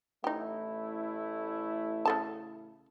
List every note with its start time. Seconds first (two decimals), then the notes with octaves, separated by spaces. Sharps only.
0.24 A1 A3 D#4 E4 G4
2.05 C#3 A4 A5